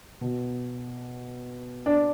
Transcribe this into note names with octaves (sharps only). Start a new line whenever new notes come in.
B2
D4